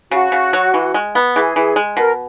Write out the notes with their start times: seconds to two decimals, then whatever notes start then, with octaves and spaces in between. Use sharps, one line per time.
0.11 C#3 F#4
0.32 C#3
0.53 F#3
0.74 E3
0.94 G#3
1.15 B3
1.36 E3 G#4
1.56 E3
1.76 G#3
1.97 B2 A#4